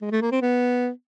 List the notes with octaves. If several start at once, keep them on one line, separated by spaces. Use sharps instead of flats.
G#3
A3
A#3
C4
B3